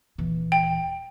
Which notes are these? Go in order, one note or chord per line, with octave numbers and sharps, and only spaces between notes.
D#1 E3
G5